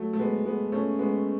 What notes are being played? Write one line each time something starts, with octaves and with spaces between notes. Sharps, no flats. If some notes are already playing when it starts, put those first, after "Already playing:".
Already playing: F#3 A3
A3
G#3 B3
G#3 B3
A3 C#4
G#3 B3